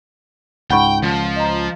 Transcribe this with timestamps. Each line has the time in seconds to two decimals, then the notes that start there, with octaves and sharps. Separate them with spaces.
0.70 C#2 G#2 F#5 G5 B5 C#6
1.03 C#2 F3
1.36 D#5 A#5